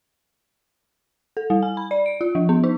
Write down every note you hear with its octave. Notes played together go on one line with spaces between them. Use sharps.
A4
G3
G#5
B5
D5
D7
F4
F3
B3
D#4